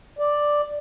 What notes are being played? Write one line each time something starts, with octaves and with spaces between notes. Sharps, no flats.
D5